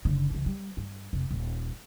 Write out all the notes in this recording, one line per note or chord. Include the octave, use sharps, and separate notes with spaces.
F#1 D3
C#2 E3
G3
G2
F1
D#1